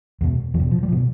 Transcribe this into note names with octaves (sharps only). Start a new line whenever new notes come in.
E2 B2
E2 F3
B2
F3
G3
F3
B2